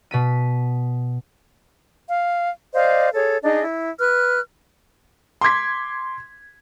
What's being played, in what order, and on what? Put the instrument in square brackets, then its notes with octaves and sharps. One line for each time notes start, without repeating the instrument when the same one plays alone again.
[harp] B2 B6 D#7
[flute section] F5
C5 D5 D#5 F5
G#4 A4 C#5
D4 D#4 G#4 D#5
E4
B4 F6 F#6
[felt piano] C6 D6 G#6 B6